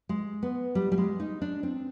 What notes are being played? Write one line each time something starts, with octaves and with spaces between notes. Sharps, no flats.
G#3
B3
G3
G3
G#3
D#4
D4
C4